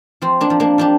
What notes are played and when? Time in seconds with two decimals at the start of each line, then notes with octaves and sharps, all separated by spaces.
0.22 F3 C4
0.41 A#3 D4
0.50 F3
0.60 A#3 D4
0.78 F3 D4 G4